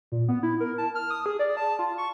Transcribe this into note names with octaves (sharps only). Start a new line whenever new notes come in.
A#2
B3
E4
A#4
A5
F6
D#6
G#4
D5
A5
F4
C#6